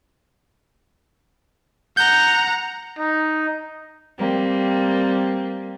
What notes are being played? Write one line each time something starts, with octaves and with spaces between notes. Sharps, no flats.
F#5 A#5 G6
D#4
G3 A#3 C4